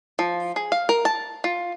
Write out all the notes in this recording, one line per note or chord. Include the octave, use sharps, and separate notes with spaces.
F3
G#4
F5
A#4
A5
F4